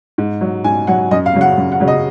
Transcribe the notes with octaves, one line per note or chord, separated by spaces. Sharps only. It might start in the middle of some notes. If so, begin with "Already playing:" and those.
G#2
F#3
G#2 G#5
F#3 F#5
F#2 D#5
F5
C#3 F#3
F#5
F#2
F#5
C#3 F#3
D#5